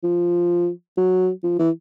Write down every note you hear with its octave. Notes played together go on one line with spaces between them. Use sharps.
F3
F#3
F3
E3